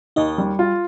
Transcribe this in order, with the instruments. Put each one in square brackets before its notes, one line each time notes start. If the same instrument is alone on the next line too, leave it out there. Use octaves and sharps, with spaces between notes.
[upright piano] D#2 [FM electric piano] D#4 D#5
[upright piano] G3
F4